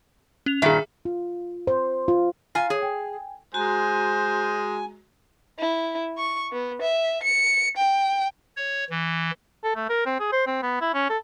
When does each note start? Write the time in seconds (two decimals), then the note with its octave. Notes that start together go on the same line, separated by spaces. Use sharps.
0.46 C#4 F7
0.62 G2 A#2 D#3 G#4 E5
1.05 F4
1.67 C5
2.08 F4
2.55 F4 F5 G#5 A#5 C7
2.70 G#4 C#5
2.82 G5 G#5
3.54 G#3 F#4 C5 G#5 A#5
5.59 E4
6.18 C#6
6.52 B3
6.82 E5
7.23 C#7
7.77 G5
8.57 C#5
8.90 E3
9.64 A4
9.76 A3
9.90 A#4
10.06 C4
10.20 G#4
10.32 C5
10.47 C4
10.63 B3
10.81 E4
10.94 C#4
11.10 A4